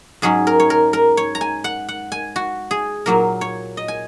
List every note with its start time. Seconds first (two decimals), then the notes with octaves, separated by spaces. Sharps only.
0.22 G#2 F#3 C#4 G#4
0.47 A#4
0.60 C#5
0.70 A#4
0.93 A#4
1.17 C#5
1.35 A#5
1.41 G#5
1.64 F#5
1.89 F#5
2.12 G#5
2.36 F#4
2.71 G#4
3.06 A#2 F#3 A#3 A#4
3.41 C#5
3.77 D#5
3.88 G#5